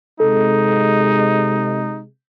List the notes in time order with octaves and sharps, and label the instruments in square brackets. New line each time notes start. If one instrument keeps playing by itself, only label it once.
[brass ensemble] C3 G#3 [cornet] D#4 [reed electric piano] A4